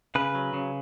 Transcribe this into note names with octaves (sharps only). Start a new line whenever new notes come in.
C#3 B4
F#3
C#3